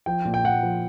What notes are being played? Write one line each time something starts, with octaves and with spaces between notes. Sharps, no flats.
F3 G5
A#2
G5
A#2 F#5
F3